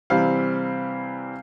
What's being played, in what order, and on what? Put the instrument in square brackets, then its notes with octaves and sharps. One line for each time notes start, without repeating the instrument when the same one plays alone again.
[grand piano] C3 E3 G3 C4 F5